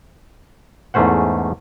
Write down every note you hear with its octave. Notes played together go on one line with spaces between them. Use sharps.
E2 G#2 A3 C#4 C5 F#5